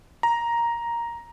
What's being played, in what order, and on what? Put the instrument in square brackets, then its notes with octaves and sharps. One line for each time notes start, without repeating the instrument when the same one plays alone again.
[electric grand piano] A#5